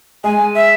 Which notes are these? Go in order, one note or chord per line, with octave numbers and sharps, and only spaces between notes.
G#3 G#5
E5